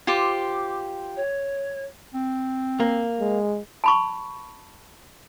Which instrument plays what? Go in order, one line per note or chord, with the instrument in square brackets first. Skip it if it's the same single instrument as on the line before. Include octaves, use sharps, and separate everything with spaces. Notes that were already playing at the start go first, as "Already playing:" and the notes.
[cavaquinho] F4 G4 C5 [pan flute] D6
[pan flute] C#5
[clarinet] C4
[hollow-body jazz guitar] A#3
[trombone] G#3
[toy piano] A5 B5 C#6